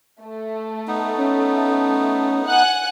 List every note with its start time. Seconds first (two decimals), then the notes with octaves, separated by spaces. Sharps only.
0.21 A3
0.88 B3 D#4
1.18 C#4
2.47 F#5 G#5 F#6